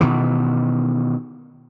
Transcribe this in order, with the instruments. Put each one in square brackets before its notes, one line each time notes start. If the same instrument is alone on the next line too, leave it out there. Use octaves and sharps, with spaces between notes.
[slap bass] B2 D#3 E3